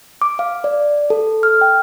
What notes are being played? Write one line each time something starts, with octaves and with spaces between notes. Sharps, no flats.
D6
F5
D5
A4
F6
G5